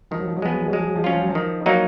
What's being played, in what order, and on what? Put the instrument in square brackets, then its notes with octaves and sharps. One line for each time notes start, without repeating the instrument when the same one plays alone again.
[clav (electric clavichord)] D#3 [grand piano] F3
[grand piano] F#3
F3
F#3
[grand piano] F3 [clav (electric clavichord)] G#3 B3
[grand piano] F#3
F3
[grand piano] F#3 [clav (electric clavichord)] G#3
[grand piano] F3
F#3
F3
[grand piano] F#3 [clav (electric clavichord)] C#4 F4
[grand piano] F3
F#3
F3
[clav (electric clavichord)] D#3
F#3 A#3 D#4